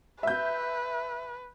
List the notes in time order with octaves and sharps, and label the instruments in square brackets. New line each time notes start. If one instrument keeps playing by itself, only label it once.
[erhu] B4 [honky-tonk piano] E5 G6